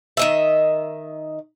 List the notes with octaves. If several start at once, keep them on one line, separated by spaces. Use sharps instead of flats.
D#3 D#5 E5